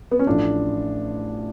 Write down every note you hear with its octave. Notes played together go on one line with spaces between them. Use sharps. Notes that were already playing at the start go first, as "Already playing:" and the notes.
B3
C#4
A1 A2 F3 D4